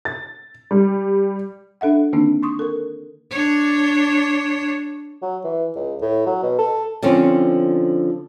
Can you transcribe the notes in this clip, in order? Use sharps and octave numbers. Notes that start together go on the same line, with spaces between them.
A6
G3
D4 A4 E5 F#5
D3 D#3 A#3 C4 D4 D#4
C6 C#6 D#6
A4 A#4
D4 C#5
F#3
E3
C#2
A2
F#3
B2
A4
D3 F3 C4 C#4